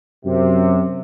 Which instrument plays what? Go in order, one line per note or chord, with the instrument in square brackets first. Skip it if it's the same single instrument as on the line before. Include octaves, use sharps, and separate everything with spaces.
[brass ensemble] F#2 C3